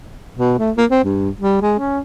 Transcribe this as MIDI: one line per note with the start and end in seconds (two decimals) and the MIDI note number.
0.37 0.54 47
0.59 0.71 57
0.77 0.85 58
0.90 1.02 60
1.04 1.30 43
1.41 1.58 55
1.62 1.74 56
1.79 1.99 61